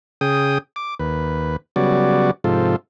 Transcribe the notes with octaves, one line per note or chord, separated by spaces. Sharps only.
C#3 G#4 G5 D#6
D6
D#2 B4
C#3 F#3 G3 B3 F#4 D5
G#2 C3 F3 F4 A4